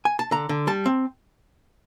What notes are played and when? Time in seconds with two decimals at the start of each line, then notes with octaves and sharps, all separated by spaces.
0.05 G#5
0.19 A5
0.31 D3 A#5
0.49 D3
0.67 G3 A5
0.86 C4